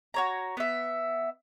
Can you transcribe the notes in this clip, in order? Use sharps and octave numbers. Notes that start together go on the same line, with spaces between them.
F#4 C#5 A#5
B3 E5